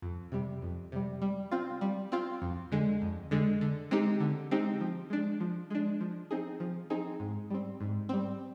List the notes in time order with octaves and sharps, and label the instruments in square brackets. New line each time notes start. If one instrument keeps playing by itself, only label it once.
[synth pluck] F2
C3 G3
F2
C3 G3
G3
C4 F4
G3
C4 F4
F2
D3 G#3
F2
D3 G#3
D3
G#3 C4 D#4 G4
D3
G#3 C4 D#4 G4
F3
G#3 D4
F3
G#3 D4
F3
C4 D#4 G#4
F3
C4 D#4 G#4
G#2
G3 C4
G#2
G3 C4